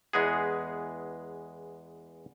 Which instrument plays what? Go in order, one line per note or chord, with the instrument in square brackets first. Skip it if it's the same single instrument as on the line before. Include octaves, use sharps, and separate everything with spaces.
[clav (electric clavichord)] E2 G#3 B3 G#4